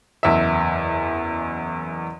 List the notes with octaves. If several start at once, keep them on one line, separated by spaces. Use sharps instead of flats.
F#1 E2 E5